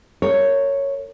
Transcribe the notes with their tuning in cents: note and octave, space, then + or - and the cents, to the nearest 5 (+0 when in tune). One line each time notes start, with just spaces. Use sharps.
A#4 -35 C#5 +0